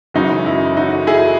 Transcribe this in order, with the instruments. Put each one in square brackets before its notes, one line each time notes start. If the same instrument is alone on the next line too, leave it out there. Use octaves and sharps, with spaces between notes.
[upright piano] G#1 F#2 C#3 E3 D#4 F#4
E4
D#4 F#4
E4 G#4